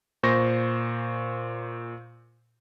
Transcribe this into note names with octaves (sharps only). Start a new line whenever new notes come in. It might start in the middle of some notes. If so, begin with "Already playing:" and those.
A#2 C5 C#6 A#6